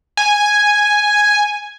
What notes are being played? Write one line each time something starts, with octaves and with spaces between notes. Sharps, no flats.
G#5